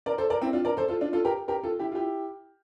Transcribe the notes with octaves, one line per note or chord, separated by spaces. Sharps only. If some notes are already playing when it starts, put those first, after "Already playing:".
A#4 D5
A4 C5
A#4 D5
C4 E4
D4 F4
A#4 D5
A4 C5
F4 A4
D4 F4
F4 A4
G4 A#4
G4 A#4
F4 A4
E4 G4
F4
E4 G4